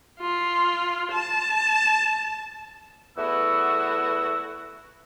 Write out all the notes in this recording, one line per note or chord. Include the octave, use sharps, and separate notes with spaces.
F4
A5
E2 A3 B3 E4 F#4 E6